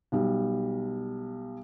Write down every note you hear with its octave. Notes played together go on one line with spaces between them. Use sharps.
B1 G3